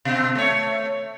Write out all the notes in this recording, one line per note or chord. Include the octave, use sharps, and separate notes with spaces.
B2 C4
A3 C#5